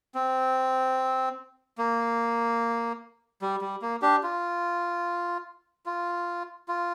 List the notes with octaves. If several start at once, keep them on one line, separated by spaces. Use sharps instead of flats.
C4
A#3
G3
G3
A#3
D4 G4
F4
F4
F4